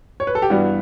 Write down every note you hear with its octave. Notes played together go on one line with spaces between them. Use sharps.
C#5
B4
A4
G4
G2 E3 G3 B3 F#4